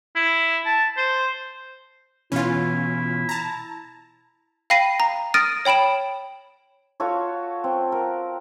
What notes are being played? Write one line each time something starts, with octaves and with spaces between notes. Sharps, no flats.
E4
A5
C5
B2 E3 C#4 E4 F4
A5 A#5
F5 G5 B5 A#6 C7 D#7
A#5
D#6 F6 A6 A#6 D7 D#7
C#5 G5 B5 D7 E7
F4 F#4 A4 C#5
C4
A#4